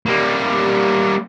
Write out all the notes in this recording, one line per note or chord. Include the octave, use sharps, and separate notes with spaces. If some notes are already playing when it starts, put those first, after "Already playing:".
G3 A#3